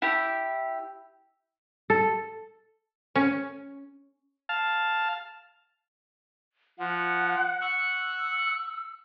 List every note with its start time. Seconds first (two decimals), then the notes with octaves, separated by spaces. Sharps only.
0.02 E4 G4
1.90 A4
3.15 C#4
4.49 F5 A5
6.79 F3 F#5
7.61 F#5 C#6 E6 F#6